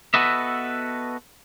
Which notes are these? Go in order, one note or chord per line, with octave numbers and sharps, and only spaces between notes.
B3 F#4 A4 B4 D#5 E5